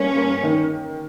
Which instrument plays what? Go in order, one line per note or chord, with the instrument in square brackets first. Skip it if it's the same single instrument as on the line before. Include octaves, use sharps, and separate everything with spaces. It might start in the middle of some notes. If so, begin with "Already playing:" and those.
Already playing: [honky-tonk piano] G2 A#3 [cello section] C#4
[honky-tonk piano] A#3
D#3